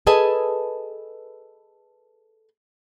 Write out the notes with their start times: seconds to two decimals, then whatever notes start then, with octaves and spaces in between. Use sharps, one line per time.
0.07 G#4 A4 B4 D#5 G#5 A5